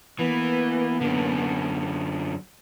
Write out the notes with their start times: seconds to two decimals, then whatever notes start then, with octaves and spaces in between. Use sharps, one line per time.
0.19 E3 A#3 B3
1.01 F#2 D3